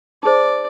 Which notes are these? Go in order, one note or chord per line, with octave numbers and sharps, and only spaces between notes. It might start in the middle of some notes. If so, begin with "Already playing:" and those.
D#4 G#4 C5 D5